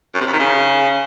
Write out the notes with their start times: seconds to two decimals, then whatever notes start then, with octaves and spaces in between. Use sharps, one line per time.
0.14 F#2
0.20 C3
0.27 F2
0.33 D#3
0.39 C#3